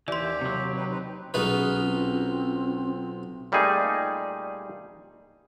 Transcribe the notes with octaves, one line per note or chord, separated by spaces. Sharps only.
D#2 E3 G4 D5 C6
C3 F#3
D#4 G4 B4
C4 D#4 B4
B1 C#4 D#4 F4 G#4 B4
C4
A#2 G3 A3 D#4 G#4